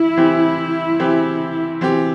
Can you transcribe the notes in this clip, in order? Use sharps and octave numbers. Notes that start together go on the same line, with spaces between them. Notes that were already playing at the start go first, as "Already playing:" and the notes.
Already playing: E3 E4
E3 C4 G4
E3 C4 G4
E3 C4 G4